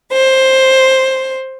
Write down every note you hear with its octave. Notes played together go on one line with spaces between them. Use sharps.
C5